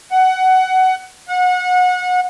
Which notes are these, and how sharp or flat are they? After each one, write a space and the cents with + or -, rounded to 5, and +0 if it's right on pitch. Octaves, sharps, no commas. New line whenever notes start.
F#5 +15
F#5 -30